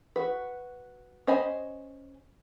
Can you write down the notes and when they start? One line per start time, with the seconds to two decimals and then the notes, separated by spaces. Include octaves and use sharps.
0.16 F#4 B4
1.27 C#4 C5 D#5 G#5 B5